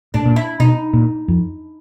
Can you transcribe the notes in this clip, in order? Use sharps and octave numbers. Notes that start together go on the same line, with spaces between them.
A2 D4
A#2
E4
B2 D#4
A#2
F2